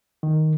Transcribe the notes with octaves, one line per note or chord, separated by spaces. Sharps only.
D#3